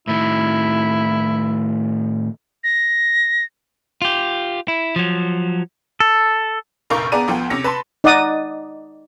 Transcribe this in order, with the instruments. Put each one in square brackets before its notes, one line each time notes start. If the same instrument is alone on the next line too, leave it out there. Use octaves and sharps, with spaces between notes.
[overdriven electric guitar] A2 D#3 [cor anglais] E4
[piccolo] A#6
[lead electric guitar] F4 G4
E4
F3 F#3
[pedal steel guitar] A4
[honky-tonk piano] F1 A#1 A#4 F5 C#6 G6
B3 D4 G#4 D5 A#5 D#7
D2 F3 B3 G5
C3 C#4 A#6 C#7
B4 A5 B5 C6
[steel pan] D#4 D5 D#5 F#5 D#6